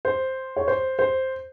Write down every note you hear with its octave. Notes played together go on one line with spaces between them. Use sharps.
C5
C#5
C5
C5